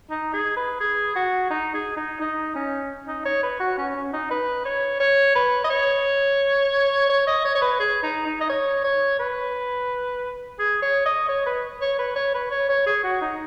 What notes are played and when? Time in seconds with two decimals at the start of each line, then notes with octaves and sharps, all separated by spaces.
0.10 D#4
0.34 G#4
0.57 B4
0.80 G#4
1.16 F#4
1.50 D#4
1.74 G#4
1.97 D#4
2.20 D#4
2.55 C#4
3.07 D#4
3.25 C#5
3.43 B4
3.60 F#4
3.78 C#4
3.96 C#4
4.13 D#4
4.31 B4
4.65 C#5
5.00 C#5
5.36 B4
5.64 D#5
5.70 C#5
7.10 C#5
7.27 D#5
7.45 C#5
7.55 C#5
7.62 B4
7.80 G#4
8.03 D#4
8.26 D#4
8.41 D#5
8.50 C#5
8.84 C#5
9.19 B4
10.59 G#4
10.82 C#5
11.06 D#5
11.29 C#5
11.46 B4
11.82 C#5
11.99 B4
12.16 C#5
12.35 B4
12.51 C#5
12.69 C#5
12.86 G#4
13.04 F#4
13.22 D#4